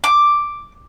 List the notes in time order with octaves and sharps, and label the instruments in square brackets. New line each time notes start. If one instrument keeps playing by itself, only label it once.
[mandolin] D6